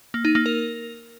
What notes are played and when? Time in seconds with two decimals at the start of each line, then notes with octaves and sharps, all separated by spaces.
0.14 A#3
0.25 D#4
0.35 A#3
0.46 A#4